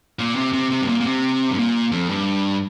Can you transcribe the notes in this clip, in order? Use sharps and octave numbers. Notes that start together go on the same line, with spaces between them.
A#2
C3
C3
C3
G2
A#2
A#2
C3
G2
A#2
F2
G2